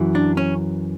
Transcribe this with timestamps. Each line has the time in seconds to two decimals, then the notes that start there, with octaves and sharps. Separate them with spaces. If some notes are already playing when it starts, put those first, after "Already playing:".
Already playing: F#2 E3
0.15 D4
0.37 C#4